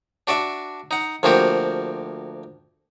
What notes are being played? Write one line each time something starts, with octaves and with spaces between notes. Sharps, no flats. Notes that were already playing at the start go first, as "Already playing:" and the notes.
D4 F#4 D5 E5
D#4 F#5
D2 F3 A#3 C4 F#4 G4